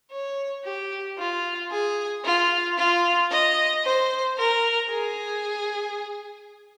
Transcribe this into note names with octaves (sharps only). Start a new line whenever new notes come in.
C#5
G4
F4
G#4
F4
F4
D#5
C5
A#4
G#4